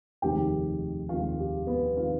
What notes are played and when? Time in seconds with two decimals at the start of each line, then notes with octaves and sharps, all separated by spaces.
0.22 F1 D#2 D#3 G#3 C4 G4 G5
1.09 F1 D#2 D#3 G#3 C4 F4 F5
1.39 G4
1.67 B3 B4
1.96 D#3 G#3 C4 F4 F5